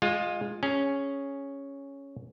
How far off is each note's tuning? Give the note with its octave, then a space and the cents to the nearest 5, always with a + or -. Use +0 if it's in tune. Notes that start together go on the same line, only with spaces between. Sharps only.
G#3 -10 F4 +15
C#4 +0 G#4 +0